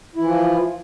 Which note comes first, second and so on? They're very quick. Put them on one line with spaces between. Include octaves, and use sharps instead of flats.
E4 E3 F3 F4